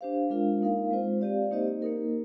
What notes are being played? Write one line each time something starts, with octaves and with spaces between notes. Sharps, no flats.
D4 G4 C5 F5
G#3 D4 F4 A#4 F5
A#3 D#4 A#4 F5
G#3 C4 F4 C5
C4 G4 D5 F5
A#3 D#4 G4 C5 D#5
A#3 D#4 A#4 D#5